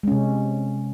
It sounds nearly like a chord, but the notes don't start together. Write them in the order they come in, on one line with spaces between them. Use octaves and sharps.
G#3 C#4 C3